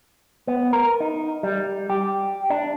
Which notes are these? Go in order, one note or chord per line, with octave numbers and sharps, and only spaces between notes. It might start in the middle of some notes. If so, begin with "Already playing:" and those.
B3
A#4
D#4
G3
G4
D4